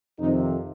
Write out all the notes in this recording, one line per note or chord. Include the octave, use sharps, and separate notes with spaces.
F2 C3 D#3 D#4